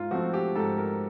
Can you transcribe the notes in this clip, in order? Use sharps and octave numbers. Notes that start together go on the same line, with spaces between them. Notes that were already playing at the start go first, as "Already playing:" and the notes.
Already playing: G#2 F4
F3 A3 C4 F#4
G4
G#2 A4
A#4